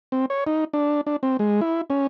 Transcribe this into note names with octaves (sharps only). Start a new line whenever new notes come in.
C4
C#5
D#4
D4
D4
C4
G#3
E4
C#4